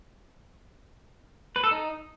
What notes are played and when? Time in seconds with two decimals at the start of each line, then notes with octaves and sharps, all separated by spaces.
1.56 B4
1.64 A4
1.71 D#4